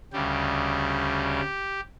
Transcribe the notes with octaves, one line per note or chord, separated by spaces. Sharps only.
D2 C#3 G3 G4